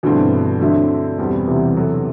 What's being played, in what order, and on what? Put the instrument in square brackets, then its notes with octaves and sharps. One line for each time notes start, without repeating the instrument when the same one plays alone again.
[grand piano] G2 E3 A3 C4 [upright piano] B2 D3
[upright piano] D3 F#3 [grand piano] A3 C4 E4
[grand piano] E2 B2 G3 C4
[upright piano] C3 E3
[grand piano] F#3 B3 F#4 A4